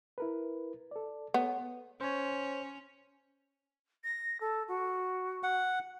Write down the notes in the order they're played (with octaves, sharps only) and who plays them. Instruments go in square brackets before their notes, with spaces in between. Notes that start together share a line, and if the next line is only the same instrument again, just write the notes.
[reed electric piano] E4 A#4 B4
A4 D5
[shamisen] B3 [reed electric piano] A4 C#5
[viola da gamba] C#4 [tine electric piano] C5 C#5
[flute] A#6
A4
F#4
[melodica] F#5